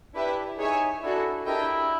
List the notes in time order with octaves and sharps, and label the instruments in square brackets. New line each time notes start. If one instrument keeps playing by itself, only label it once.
[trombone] D4 [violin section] E4 G4 B4 E5
[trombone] D#4 [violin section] G#4 C#5 E5 G#5
[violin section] D4 F#4 A4 [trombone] E4
[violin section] D4 G4 A#4 D#5 G5 [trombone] E4